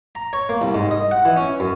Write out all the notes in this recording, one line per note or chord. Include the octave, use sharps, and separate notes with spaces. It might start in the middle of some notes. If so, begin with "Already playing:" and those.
A#5
C#5
A#3
C2
G#2
D#5
F#5
E3
C#4
F#2